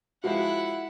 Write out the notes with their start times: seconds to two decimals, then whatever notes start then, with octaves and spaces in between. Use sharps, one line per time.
0.24 F3 G#3 E4 F#4 F#5